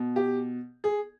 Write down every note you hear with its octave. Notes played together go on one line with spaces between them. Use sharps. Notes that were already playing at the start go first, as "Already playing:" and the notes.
Already playing: B2
G4
G#4